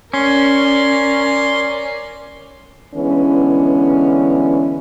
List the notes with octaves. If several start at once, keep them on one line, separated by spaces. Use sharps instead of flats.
C#4 A#4 D5 C6
D3 E3 G#3 B3 C#4